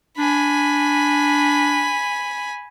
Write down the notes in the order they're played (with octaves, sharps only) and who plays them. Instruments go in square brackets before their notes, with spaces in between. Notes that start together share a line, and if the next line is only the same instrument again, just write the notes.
[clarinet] D4 [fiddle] G#5 B5